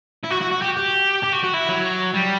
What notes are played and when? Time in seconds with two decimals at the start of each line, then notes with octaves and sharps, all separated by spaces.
0.24 E4
0.31 F#4
0.41 F#4
0.51 F#4
0.62 G4
0.76 G4
1.23 G4
1.33 F#4
1.44 F#4
1.54 E4
1.69 F#3
2.14 G3